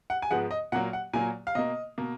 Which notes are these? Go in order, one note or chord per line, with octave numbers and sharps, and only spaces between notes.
F#5
G#5
G#2 F3 G#3 B3 F#5
D#5
A#2 F#3 A#3 F#5
F#5
A#2 F#3 A#3 G#5
F5
B2 A#3 D#5
B2 A#3